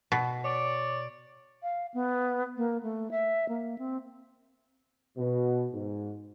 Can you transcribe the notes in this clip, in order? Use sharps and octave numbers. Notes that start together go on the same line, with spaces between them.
B2
C#5 D5
F5
B3
A#3
A3
E5
A#3
C4
B2
G#2